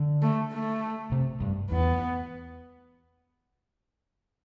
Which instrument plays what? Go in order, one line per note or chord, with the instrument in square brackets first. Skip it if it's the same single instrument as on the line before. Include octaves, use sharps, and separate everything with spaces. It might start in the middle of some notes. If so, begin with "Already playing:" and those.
Already playing: [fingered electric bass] D3
[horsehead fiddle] A3
A3
[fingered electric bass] C3
G2
[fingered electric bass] E2 [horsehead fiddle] B3